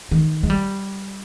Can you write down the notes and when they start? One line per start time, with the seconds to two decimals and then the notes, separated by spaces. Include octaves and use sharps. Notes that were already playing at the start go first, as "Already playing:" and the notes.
0.11 D#3
0.43 G#3
0.50 G3